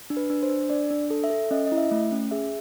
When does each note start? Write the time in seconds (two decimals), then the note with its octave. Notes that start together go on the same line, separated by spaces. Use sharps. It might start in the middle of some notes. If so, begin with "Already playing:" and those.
0.10 D4
0.17 B4
0.30 D4
0.43 C5
0.50 D4
0.70 D4 D5
0.91 D4
1.10 A4
1.24 E5
1.30 A4
1.51 C#4 D#5
1.66 D#5
1.72 E4
1.78 E5
1.91 A3
2.12 C#4
2.31 G#4 E5